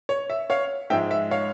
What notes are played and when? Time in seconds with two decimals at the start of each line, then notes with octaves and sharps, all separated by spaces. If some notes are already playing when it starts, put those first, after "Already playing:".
0.09 C#5
0.30 E5
0.50 C#5 F5
0.90 G#2 F3 G#3 E5 G5
1.11 E5
1.31 C#5 F5